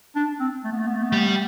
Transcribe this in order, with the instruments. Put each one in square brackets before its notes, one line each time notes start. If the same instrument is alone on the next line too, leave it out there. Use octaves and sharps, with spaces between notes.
[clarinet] D4
C4
A3
B3
A3
B3
A3
B3
[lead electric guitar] G3 [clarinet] A3
[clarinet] B3
A3